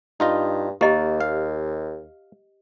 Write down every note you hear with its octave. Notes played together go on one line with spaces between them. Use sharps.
G2 D#4 F4 D#5
D#2 A#3 G4 D#5
F5